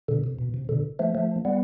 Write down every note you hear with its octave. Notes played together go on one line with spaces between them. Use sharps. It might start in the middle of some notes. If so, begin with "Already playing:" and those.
B2 D3
C3
B2
C3
B2 D3
F3 A3
F3 A3
G3 B3